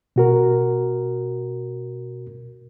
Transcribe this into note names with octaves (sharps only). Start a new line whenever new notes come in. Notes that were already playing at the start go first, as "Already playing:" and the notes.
B2 F#4 A#4